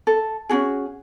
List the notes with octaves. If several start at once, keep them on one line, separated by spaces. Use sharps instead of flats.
A4
C#4 F4 F#4 G#4